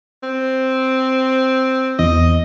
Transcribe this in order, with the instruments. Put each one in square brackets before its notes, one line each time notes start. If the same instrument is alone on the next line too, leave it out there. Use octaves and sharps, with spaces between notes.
[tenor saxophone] C4
[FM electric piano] E2 [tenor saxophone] D#5